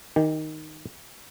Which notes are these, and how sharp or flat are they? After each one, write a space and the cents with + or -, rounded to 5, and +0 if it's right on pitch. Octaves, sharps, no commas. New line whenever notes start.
D#3 +0 G4 +0 G5 +40